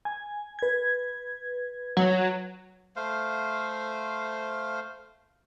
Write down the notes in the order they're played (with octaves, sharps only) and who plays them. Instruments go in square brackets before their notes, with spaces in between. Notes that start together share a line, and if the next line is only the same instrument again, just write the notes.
[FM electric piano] G#5
B4 G#6
[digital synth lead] F#3
[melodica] A3 C5 F5